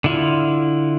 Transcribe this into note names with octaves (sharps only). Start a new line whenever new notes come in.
D3 E4 F4